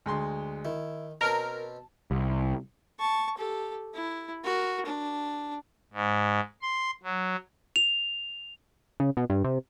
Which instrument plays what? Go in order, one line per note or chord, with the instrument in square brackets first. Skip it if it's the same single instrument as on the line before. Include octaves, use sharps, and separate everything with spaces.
[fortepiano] D2 G#3 C6
[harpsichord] D#3 [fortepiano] E4
[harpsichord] B2 C4 C#4 [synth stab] A#4 [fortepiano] A5
[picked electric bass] C2
[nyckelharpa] A5 C#6
G4 A4
E4
F#4 A#4
D4
[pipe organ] G#2
C6
F#3
[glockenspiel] F7
[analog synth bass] C#3
B2
G2
C3